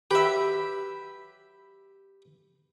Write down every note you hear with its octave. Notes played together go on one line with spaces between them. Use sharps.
F#3 G4 B4 E5